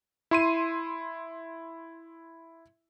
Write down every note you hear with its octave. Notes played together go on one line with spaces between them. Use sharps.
E4 C6 D#7